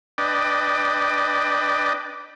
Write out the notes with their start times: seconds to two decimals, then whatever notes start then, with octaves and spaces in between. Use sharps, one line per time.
0.18 D4 B4 D5 D#5 G5